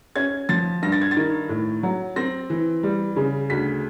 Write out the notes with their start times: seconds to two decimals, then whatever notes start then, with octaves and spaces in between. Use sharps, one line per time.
0.16 C#4 G#6
0.49 F3 A6
0.82 G2 A#6
0.92 A6
1.02 G#6
1.11 A6
1.17 D#3
1.49 A2
1.83 F#3
2.16 C4 A#6
2.50 E3
2.83 G3
3.16 C#3
3.50 D2 B6